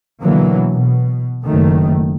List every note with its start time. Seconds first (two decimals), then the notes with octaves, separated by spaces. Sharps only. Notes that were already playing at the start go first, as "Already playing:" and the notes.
0.22 B2 D3 E3 F#3 A#3
0.71 B2
1.44 F#1 F#2 D#3 A3